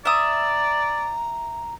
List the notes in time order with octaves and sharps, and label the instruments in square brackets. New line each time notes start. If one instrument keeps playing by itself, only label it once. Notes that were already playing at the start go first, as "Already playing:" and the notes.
[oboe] D5 [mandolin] E5 D#6 [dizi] A#5